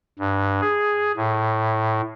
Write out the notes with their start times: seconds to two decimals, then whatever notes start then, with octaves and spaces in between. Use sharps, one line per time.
0.19 G2
0.61 G#4
1.17 A2